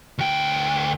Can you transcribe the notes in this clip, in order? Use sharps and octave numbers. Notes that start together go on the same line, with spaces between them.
D2 G5